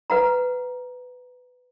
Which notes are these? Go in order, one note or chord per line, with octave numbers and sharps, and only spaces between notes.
B4 F#5 A#5